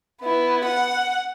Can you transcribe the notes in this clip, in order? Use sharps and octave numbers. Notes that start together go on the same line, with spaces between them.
B3 E4
F#5